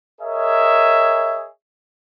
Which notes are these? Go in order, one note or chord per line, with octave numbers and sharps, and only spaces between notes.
G#4 A#4 C#5 D#5 E5